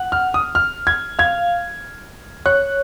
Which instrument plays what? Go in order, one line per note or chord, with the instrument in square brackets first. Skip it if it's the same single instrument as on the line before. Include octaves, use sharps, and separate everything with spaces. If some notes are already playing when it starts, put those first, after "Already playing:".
Already playing: [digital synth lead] F#5
[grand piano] F6
D#6
F6
G#6
[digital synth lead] F5 [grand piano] G#6
[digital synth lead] C#5 [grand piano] F#6